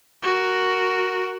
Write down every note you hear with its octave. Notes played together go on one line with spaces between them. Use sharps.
F#4 A#4